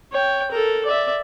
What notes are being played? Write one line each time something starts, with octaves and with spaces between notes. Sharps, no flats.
C#5 G5
A4 A#4
D5 E5